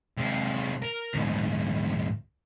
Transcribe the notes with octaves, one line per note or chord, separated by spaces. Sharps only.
C3 G#3
A#4
D2 G#2